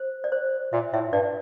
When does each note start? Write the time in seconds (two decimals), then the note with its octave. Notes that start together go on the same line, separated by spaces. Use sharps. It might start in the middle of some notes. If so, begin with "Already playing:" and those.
Already playing: C5
0.24 D5
0.32 C5
0.73 A#2 E5
0.93 A2 E5
1.13 G2 D5